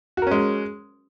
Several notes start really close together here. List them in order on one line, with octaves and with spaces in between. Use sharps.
F#4 A#4 C#4 G#3